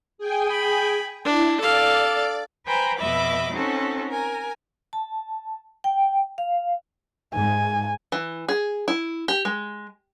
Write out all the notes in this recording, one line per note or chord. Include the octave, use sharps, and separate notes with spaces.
G#4 G5 G#5
B5
D4 E4
A4 D5 F5 D6 A6
B4 C5 G5 G#5 A#5 B5
F2 B2 D#5 E5 B5 D6
C4 C#4 D#4 F#4 A4
A#4 G#5
A5
G5
F5
G#2 G#5
E3
G#4
E4
G4
G#3